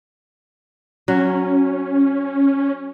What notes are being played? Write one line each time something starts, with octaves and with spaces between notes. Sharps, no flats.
F#3 C#4